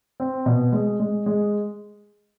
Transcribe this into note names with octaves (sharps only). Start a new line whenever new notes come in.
C4
B2
G#3
G#3
G#3